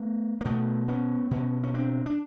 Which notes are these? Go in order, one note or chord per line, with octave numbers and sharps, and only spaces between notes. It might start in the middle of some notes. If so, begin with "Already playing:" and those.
Already playing: A3 B3
A#3
B2 A3 B3
B3 C#4
B2 B3 C#4
C#4
C4 D4
D4